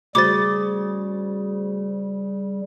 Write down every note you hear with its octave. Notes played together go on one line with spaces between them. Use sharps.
C#3 G3 A3 F#4 C5 D6 A6